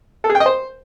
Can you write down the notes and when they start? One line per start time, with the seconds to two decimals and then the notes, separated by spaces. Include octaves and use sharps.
0.24 A4
0.29 G#4
0.35 G5
0.40 D#5
0.46 C5